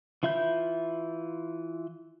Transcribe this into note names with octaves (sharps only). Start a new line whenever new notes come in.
E3 F4 E5 B5 G6